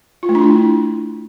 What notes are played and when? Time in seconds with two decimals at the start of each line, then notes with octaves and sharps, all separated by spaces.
0.23 F4
0.29 A3
0.35 D4
0.41 E4